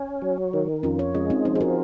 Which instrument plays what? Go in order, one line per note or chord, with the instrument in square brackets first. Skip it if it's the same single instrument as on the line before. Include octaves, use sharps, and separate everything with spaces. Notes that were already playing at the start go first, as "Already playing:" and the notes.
Already playing: [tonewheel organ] C#4
F#3
D#3
[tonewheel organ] F2 [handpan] C#4 F4
[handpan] A#4 C#5
[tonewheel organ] G#3 [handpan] C#4 F4
[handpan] C4 D#4
[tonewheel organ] F3 [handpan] C4 D#4
[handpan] G#4
F#4 A#4